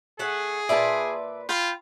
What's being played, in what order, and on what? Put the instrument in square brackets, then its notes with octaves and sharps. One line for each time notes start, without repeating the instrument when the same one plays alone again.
[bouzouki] A3 F#5 [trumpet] G#4
[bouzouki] A#2 B4 D5 [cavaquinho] E5 A5
[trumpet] F4 [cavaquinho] G5 B5